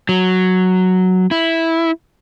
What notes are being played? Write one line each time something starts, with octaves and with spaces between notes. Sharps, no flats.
F#3
E4